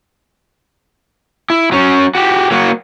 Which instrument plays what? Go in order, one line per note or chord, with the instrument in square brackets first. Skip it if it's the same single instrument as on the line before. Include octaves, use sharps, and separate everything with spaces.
[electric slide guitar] E4
F#3 C#4
F#4 G4
F#3 A#3 F#4